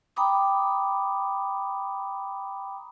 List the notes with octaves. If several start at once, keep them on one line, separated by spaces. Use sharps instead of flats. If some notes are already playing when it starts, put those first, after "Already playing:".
G5 A#5 B5 D6 D#6